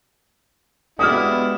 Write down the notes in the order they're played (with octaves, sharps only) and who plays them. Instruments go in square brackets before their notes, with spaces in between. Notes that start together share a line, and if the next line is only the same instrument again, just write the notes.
[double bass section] G#3 B3 [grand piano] D4 F#4 G4 [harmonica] E4 [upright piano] D#6 F6